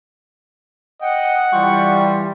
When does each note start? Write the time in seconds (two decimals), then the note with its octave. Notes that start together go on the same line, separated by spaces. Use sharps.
1.02 D#5 F#5 G5
1.52 E3 G3 F4 G5 C#6